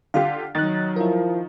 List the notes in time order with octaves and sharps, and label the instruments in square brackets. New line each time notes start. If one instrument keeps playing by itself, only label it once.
[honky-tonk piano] D3 F4 G4 [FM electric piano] F5
[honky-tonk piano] D#3 D#4 [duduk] F#3 [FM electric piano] F#6 A6
[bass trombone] F3 [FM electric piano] E4 A#4